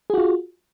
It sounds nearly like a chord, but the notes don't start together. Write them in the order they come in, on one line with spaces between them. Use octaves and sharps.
G#4 F#4 F4